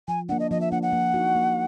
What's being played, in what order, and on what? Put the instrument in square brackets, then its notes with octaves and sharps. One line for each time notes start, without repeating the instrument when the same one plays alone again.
[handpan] F3 [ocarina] G#5
[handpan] A#3 D4 [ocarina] F#5
[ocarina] D#5
[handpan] F3 [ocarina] D#5
[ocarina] E5
[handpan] A#3 D4 [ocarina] F#5
[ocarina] F#5
[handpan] A#3
D#4 F#4
A#3